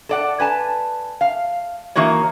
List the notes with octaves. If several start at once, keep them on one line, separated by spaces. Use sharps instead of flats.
A4 D5 F#5
B4 G#5 A5
F5
E3 A#3 D#4 F#4 C#5